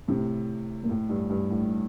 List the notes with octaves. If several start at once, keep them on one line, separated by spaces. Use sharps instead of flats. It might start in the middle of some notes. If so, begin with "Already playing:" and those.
A2 C3
A#2
A2
G2
G2
A2